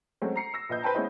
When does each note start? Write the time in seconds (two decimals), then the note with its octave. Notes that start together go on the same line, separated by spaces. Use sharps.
0.22 F#3 G#3 A3 C4 C#4 F#4
0.36 A#5 C7 C#7
0.54 E6 A#6
0.69 A#1 B4 D#5 G6
0.82 B4 C5 G5 A5 A#5
0.95 G#3 B3 C#4 E4 C5 D#5